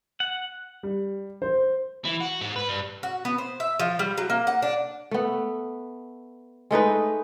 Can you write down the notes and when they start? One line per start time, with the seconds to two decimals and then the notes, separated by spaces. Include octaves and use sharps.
0.20 F#5
0.83 G3
1.42 C5
2.05 E3
2.20 F#4
2.41 G#2
2.56 B4
2.69 G2
3.03 F#4
3.25 B3
3.38 C5
3.60 E5
3.80 F3
3.99 G3
4.18 F#3
4.30 A#3
4.47 F#5
4.62 D4
5.11 A3 B3
6.71 G#3 A3 D#4 B4